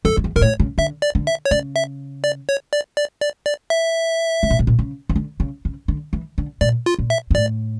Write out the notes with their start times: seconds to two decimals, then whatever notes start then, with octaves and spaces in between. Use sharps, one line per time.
0.05 F2 A4
0.17 F2
0.24 E2
0.36 A#2 A#4
0.41 A2 C#5
0.60 C#3
0.78 D3 E5
1.02 D5
1.15 D3
1.27 E5
1.45 C#5
1.51 C#3 D5
1.76 E5
2.24 D5
2.49 C#5
2.73 D5
2.97 D5
3.21 D5
3.46 D5
3.70 E5
4.43 C#3
4.50 A#2
4.59 A2
4.67 A#2
4.79 C#3
5.09 E3
5.16 D3
5.40 C#3
5.65 C#3
5.88 D3
6.13 E3
6.38 D3
6.61 A#2 D5
6.86 F4
6.99 A#2
7.10 E5
7.31 G2
7.34 A2 D5